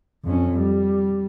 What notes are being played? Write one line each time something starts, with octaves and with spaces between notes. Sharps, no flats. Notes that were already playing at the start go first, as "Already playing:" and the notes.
F2 C#4
G3